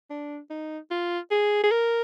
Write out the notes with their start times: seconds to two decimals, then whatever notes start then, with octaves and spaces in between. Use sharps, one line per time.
0.10 D4
0.50 D#4
0.91 F4
1.31 G#4
1.63 G#4
1.71 A#4